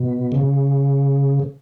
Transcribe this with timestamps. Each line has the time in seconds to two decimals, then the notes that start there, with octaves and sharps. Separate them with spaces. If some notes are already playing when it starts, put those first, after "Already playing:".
Already playing: B2
0.32 C#3